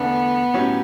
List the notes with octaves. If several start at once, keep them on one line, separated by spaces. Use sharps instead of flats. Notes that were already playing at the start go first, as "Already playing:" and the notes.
Already playing: E2 D3 A3 B3 D4
A2 F#3 C#4 E4 G4